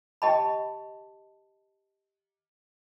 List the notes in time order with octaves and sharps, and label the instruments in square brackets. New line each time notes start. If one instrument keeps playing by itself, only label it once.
[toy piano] G4 D#5 G5 A5 B5